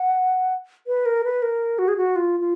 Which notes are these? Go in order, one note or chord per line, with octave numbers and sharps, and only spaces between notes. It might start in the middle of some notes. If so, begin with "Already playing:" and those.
Already playing: F#5
B4
A#4
B4
A#4
F#4
G#4
F#4
F4
F4